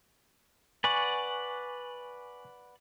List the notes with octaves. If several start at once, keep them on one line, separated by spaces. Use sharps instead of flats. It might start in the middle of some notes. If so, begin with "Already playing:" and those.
B4 D5 F#5 G#5 C#6